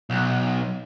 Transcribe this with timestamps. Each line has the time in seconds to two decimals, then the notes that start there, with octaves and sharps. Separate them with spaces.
0.10 B1